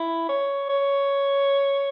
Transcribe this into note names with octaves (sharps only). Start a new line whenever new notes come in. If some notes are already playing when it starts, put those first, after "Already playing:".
Already playing: E4
C#5
C#5